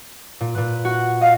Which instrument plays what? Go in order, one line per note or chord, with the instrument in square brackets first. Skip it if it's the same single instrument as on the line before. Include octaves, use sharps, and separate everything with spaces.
[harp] A#2
A#2 B4
F#4
[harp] D#5 [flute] F5